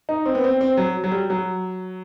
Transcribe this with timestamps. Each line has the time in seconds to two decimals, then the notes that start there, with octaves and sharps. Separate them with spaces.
0.09 D#4
0.26 C4
0.35 B3
0.44 C4
0.61 C4
0.77 F#3
1.04 F#3
1.11 G3
1.30 F#3